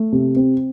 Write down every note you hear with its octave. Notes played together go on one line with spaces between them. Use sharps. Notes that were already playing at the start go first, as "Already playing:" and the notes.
Already playing: A3
C3
C4